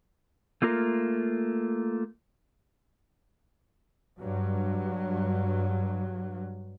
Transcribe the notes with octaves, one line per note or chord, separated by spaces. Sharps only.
A3 A#3 F4 A#4
G2 F#3